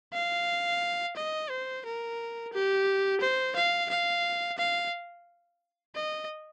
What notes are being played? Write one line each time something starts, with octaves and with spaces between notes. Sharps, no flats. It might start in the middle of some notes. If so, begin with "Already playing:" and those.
F5
D#5
C5
A#4
G4
C5
F5
F5
F5
D#5